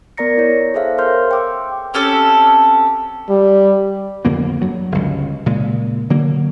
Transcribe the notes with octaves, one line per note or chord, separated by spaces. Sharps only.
B3 A#4 D5 A#5 A#6 C#7
E4 C#5
G#4 A4 C5 E5 F5
A#4 C5 C#5 C6 F6 G6
G5 C6 D6 E6
C4 C#4 G4 A4
G3
F2 D3 A#3 B3
G2 F#3
G1 C#2
A#2 C#3 G#3
D3 F#3 A#3